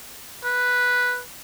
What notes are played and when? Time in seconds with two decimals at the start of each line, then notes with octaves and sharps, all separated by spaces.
0.45 B4